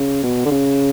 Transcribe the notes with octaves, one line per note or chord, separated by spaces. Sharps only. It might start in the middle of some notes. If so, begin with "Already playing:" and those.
Already playing: C#3
B2
D3
C#3